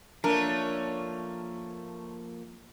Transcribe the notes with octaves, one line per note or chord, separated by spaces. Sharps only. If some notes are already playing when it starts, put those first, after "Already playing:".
F3 A3 A#3 C#4 D4 A#4